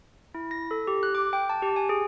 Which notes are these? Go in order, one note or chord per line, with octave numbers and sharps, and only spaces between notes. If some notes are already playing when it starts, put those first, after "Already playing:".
E4
A#6
A4
G4
F#6
D6
G5
A5
G4
G#5
G#4